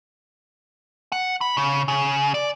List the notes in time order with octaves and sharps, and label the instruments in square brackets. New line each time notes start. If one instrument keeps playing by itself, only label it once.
[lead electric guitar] F#5
B5
C#3
C#3
D5